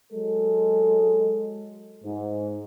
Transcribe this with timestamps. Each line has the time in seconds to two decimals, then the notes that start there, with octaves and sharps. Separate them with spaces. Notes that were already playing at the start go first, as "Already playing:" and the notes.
0.12 F#3 G#3 A4
2.04 G#2